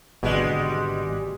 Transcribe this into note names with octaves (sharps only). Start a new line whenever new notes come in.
G#1 B2 D3 G3 G#3